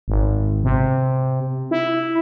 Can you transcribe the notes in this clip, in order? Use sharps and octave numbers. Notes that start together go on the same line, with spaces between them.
G#1
C3
E4